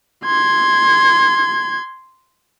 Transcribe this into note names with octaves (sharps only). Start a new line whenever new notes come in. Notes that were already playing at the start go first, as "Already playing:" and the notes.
C6 G#6